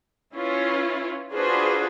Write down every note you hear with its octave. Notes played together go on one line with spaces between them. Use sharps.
C#4 E4 F4 B4 C#5
D4 F4 F#4 G#4 B4 C5